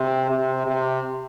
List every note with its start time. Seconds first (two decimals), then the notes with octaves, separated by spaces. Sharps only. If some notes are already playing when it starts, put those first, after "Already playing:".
Already playing: C3
0.30 C3
0.67 C3